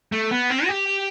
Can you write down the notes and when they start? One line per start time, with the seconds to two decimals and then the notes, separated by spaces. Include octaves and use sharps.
0.12 A3
0.31 B3
0.50 C4
0.64 F#4
0.69 G4